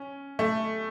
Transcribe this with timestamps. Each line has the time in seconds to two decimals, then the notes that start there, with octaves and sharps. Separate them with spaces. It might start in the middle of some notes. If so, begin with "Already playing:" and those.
Already playing: C#4
0.39 A3